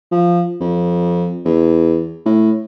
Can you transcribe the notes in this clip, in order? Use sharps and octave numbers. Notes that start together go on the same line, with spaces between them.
F3
F2
E2
A2